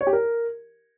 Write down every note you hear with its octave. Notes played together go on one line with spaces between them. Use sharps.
C#5
G4
A#4